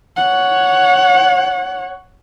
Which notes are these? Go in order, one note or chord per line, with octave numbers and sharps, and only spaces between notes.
C#5 F#5